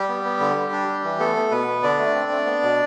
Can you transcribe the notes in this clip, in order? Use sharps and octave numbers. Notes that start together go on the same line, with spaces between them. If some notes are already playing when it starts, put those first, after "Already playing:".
Already playing: G3 G4
B3
B3
D3
G3
D4
G3
E3
A3 B3 A4
B3
B2 B3 B4
B3
D3 D4 D5
A3
C4
A3
B3
B2